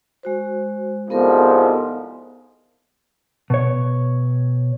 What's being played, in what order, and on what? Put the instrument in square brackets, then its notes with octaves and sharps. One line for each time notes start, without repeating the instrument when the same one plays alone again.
[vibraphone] G#3 F#4 C5
[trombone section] C2 G#2 F3 [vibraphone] B3 A4 A#4
[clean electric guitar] B2 C#5